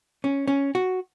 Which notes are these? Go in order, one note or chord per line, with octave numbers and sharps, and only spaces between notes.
C#4
C#4
F#4